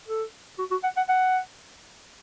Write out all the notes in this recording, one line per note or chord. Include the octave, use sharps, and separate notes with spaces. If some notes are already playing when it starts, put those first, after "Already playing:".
A4
F#4
F#4
F#5
F#5
F#5